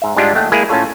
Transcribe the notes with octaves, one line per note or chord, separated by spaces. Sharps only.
G#2 E5
G#2 G3 G#3 D4 F4 G4
D#2 A3 F#5 G5
G#3 A#3 E4 G#4
A2 C#4 F4 A4 C#5